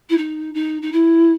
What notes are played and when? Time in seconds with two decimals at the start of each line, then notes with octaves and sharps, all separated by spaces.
0.09 E4
0.17 D#4
0.54 D#4
0.81 D#4
0.92 E4